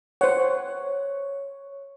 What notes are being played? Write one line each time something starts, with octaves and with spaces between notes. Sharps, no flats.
C5 C#5 F#5